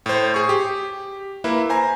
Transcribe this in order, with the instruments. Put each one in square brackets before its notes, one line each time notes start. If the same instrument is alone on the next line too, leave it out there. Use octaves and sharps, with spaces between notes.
[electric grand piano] A2 C5
G#4 C#6
G4
A#3 E4 B4
C5 G#5 A#5